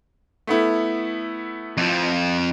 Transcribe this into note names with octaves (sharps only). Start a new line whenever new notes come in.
A3 B3 E4
F2 F3